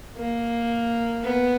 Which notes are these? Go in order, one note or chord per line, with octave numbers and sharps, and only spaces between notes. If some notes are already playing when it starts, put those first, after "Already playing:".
A#3
B3